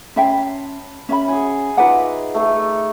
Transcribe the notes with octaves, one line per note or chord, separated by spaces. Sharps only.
C#4 E5 G5 A5 B5 C6
C#4 E5 B5
G#4 F#5 G#5
D#4 F4 B4 D5 E5 F#5
A3 A4